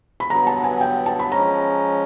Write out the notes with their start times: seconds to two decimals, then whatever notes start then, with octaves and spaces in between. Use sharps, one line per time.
0.20 B5
0.30 G2 D3 F#3 B3 A#5
0.47 A5
0.64 G#5
0.81 G5
1.06 A5
1.19 B5
1.32 F3 G#3 C#4 A#5